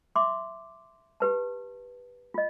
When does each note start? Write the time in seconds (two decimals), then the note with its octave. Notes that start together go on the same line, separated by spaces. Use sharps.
0.15 E5 C6 D6
1.20 G4 B4 A5
2.34 F4 D#5